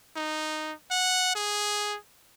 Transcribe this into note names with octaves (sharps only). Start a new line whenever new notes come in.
D#4
F#5
G#4